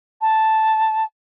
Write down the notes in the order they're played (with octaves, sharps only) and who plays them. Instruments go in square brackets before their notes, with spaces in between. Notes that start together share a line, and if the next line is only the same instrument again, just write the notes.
[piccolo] A5